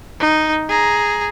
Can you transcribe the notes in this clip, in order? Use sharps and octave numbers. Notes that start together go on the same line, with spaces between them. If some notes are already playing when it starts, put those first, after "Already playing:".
D#4
G#4 A#5